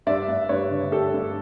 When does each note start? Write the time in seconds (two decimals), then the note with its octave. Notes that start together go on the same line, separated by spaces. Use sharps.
0.06 G2 D5 E5
0.28 G2
0.49 G2 B4 C#5
0.70 D3
0.91 G2 G4 A4
1.14 G2